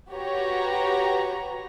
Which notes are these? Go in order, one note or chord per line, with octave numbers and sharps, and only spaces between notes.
F#4 G4 B4 C#5 A#5